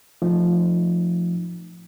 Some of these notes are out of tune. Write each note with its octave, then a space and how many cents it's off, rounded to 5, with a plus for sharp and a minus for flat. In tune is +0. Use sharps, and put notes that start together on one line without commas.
F3 +0 A3 +0 D#4 -20